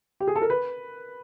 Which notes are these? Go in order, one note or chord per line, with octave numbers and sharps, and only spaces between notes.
G4
G#4
A4
A#4
B4